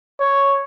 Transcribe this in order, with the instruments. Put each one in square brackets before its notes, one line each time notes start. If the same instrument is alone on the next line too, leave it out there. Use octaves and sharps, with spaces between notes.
[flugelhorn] C#5